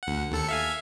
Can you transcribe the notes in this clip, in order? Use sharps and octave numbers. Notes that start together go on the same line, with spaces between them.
D2 F#5
D#2 A4 C#7
E5 F5 G#5